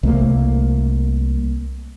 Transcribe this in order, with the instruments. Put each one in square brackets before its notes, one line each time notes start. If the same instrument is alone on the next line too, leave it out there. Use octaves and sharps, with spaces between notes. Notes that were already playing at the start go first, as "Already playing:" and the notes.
[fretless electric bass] C2 A3 A#3